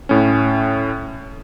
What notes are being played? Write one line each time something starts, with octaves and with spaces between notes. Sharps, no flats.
A2 C#4